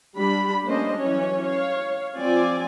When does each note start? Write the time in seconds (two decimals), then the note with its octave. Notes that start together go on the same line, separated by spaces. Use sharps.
0.16 G3 D4 G4 B5
0.64 A3 A#3 C#4 D4 C5 D#5
0.98 E3 F#3 C#4 C#5
1.46 C#5 F5
2.16 F3 C4 F4 D5 G#5